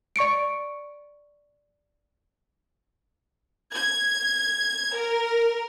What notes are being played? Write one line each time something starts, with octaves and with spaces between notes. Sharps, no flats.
D5 C#6 C#7 D7
G#6
A#4